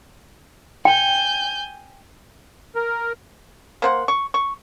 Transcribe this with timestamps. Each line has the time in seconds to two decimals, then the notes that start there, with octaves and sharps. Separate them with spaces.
0.85 G5 G#5 G6
2.75 A#4
3.82 A#3 C5 F#5
4.08 C#6
4.34 C#6